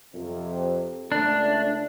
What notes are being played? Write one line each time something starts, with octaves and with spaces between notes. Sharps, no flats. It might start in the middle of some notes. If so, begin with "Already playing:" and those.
F2 C3
C#2 A3 D4